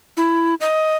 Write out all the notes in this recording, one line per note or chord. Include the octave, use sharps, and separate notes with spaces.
E4
D#5